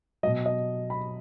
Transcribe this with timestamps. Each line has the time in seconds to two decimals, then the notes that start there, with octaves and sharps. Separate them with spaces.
0.23 F#3 D#5
0.27 B2
0.46 D#5
0.90 B5